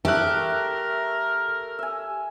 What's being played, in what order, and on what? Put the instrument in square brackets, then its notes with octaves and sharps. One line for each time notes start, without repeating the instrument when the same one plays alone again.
[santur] A3 [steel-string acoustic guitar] G4 [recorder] A#4 [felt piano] E5 F#6
[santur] E5 G#5